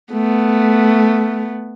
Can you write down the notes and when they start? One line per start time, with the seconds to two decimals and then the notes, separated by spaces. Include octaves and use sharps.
0.12 A3 B3